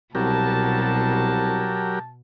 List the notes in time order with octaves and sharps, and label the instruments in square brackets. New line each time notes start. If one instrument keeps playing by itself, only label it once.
[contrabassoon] C2 [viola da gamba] B2 [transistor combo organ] F#3 G4 A#4 [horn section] A5